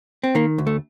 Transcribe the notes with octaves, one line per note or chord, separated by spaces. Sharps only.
C4
D#3 A#3
D2
A3